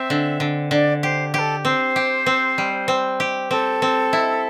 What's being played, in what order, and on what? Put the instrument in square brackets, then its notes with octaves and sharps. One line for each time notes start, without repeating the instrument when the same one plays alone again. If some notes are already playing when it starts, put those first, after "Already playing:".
Already playing: [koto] C4 [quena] E5
[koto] D3
D3
[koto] D3 [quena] D5
[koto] G4 [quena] C5
[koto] G4 [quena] A4 C5
[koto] C4 [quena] C5
[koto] G4
C4
G3
C4
G4
[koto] C4 [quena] A4
[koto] C4
E4